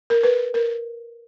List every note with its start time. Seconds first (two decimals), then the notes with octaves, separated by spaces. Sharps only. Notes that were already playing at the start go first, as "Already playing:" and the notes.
0.10 A#4
0.23 B4
0.54 A#4